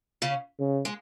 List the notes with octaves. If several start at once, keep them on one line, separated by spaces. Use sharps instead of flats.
C#3 C#4
C#3
G#3